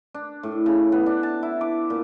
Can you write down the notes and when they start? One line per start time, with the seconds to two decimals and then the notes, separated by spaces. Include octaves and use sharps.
0.14 D4
0.43 A2
0.66 C#3
0.92 B3
1.06 D4
1.23 A5
1.43 E4
1.61 D6
1.90 A#2